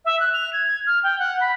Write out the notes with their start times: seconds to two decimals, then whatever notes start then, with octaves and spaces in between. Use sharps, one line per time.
0.05 E5
0.20 F#6
0.33 F7
0.53 G#6
0.67 G#6
0.87 F6
1.03 G5
1.19 F#5
1.41 B5